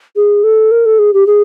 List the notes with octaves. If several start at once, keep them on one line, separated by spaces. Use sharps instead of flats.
G#4
A4
A#4
A4
G#4
G4
G#4